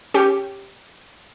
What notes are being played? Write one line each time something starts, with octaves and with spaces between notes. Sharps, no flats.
C#4 G4